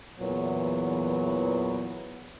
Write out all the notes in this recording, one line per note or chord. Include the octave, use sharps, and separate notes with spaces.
E2 A#2 E3 F#3 B3